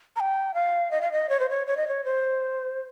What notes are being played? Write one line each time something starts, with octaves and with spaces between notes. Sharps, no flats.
A#5
G5
F5
D#5
F5
D#5
C#5
C5
C#5
C#5
D#5
C#5
C5